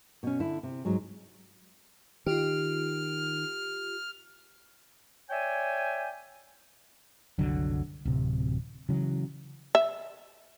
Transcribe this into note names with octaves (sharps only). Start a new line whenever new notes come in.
B2 C#4
D3 E4
C3
G#2 F#3 G#3
D#3 F4 G4 F6
C#5 D5 E5 G5 G#5
F#1 C2 D3 F#3
D1 C3
C#3 E3 F#3
E5